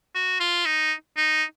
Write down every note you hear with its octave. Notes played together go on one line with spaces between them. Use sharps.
F#4
F4
D#4
D#4